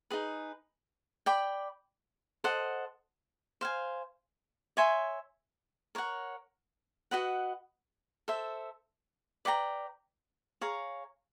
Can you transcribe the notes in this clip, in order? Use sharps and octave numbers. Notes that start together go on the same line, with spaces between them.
D#4 G#4 B4
D5 G5 B5
A4 C5 D#5 F#5
C5 F5 G#5
C#5 E5 G#5 C6
A#4 C#5 F#5
F#4 B4 D#5 F#5
A4 C5 E5
B4 D5 G5 A#5
G#4 C#5 F5 A#5